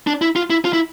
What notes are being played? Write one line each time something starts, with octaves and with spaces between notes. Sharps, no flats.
D4
E4
F4
E4
F4
E4